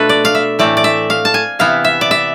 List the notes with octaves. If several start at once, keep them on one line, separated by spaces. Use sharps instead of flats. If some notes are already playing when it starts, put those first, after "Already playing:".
Already playing: B2 A3 D4 F4 A4 B4
D5
F5
E5
A2 E3 A3 C4 D5
D5
E5
F5
A5
G#5
C3 E3 B3 E4 F5
E5
D5
E5